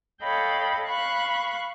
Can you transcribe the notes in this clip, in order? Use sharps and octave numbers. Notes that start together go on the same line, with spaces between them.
A4 C#5 D#5 F5 G5 B5
F5 B5 C#6 F#6